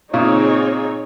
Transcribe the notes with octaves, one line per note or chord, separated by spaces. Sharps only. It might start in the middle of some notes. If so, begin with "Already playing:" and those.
A#2 C#3 C4 D#4 G#4 C#5